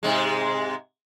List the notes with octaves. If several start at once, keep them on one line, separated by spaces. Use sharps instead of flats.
G#2 C3 G#3